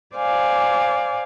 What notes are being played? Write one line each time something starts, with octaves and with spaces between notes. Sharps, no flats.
C5 D5 F5 G#5